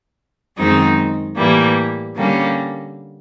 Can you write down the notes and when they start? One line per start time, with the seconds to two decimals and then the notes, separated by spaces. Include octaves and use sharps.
0.57 F#2 D#3 G#3 C4 D#4
1.36 A2 E3 G3 A#3
2.15 D3 G3 A#3 C#4